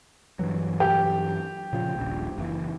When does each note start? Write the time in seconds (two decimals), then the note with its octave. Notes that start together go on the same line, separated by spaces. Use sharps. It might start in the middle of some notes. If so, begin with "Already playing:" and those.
0.39 G2 E3 F#3
0.80 G4
1.73 A#2 C#3 F3
1.96 D#1 A#1
2.37 F#1 E3